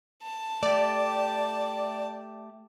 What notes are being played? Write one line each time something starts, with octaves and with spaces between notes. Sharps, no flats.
A5
A3 G4 D5